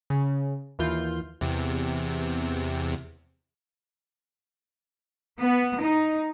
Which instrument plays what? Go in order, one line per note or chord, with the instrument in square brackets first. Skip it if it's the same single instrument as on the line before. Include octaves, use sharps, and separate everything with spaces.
[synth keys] C#3
D#2 E3 F4 G6
[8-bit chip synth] E2 C3
[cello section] B3
D#4